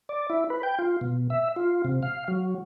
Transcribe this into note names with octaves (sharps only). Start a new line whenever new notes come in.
D5
E4
B4
G5
F4
B2
E5
F4
C3
F5
F#3